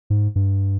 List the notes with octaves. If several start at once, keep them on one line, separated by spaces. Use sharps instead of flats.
G#2
G2